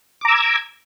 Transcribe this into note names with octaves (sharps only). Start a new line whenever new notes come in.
A#5 D6 E6 G#6